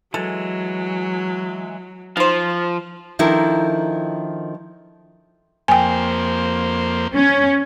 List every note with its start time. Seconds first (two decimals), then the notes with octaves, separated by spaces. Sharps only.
0.14 E3 F#3 G#3 A4
2.17 F3 D#4 F4 C5
3.19 D#3 F3 D4 E4 A4 A#4
5.68 F2 A#3 C5 G5 G#5
7.15 C#4